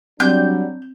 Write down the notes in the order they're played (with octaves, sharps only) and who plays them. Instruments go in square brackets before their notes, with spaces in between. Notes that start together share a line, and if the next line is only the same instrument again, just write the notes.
[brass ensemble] F#3 G3 D4 [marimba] C4 [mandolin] G6